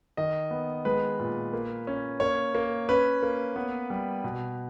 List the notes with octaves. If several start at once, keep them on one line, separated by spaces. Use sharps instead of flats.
D#3 D#5
B3
G#3 B4
A#2
A#3
C#4
A#3 C#5
A#3
C#4 B4
A#3
B3
G3
B2